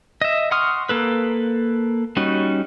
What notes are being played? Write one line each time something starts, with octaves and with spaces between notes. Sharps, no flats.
D#5 E5
F#5 C6 C#6 D#6 F6
A#3 A4 B4
G3 C#4 D#4 F#4